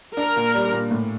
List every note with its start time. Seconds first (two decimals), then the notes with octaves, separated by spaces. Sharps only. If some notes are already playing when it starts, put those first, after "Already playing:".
0.17 D4 A#4
0.36 A#2
0.54 G3
0.72 A#2
0.91 A2